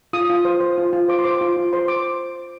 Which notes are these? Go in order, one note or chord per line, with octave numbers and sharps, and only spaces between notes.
F4 D#6
F4
C5
C5
F4
F4
C5 D6
C6
C5 D6
F4
F4
C5 C6
C5 D6